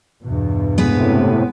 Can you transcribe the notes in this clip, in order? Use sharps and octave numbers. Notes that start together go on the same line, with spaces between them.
E2 G2 B2
A2 C3 G#3 B3 B4